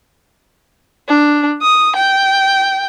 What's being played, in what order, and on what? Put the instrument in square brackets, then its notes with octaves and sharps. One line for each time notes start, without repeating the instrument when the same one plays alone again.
[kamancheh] D4
D#6
G5